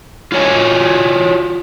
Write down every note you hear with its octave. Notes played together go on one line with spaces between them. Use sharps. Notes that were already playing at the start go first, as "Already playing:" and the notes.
F4 F#4 C#5 D5 G#5